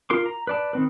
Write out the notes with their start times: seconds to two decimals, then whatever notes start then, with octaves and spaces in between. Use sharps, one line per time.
0.10 F4 A#4 C6 D6
0.26 A#5
0.47 B4 D5 A5
0.73 D#3 C4 B4